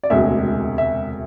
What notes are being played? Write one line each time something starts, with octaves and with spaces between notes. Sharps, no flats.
D5
E1 D2 C3 G#3 E5
E5